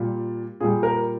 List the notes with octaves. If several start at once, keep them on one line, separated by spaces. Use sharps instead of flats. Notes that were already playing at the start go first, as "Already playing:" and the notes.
Already playing: A#2 G3
A#2 G3 G#4
A#4